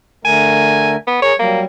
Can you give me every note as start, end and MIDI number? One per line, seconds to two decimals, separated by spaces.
0.25 0.96 50
0.25 0.96 57
0.25 0.96 70
0.25 0.94 80
1.07 1.21 59
1.22 1.33 68
1.22 1.33 70
1.22 1.34 73
1.39 1.65 54
1.39 1.65 55
1.39 1.60 58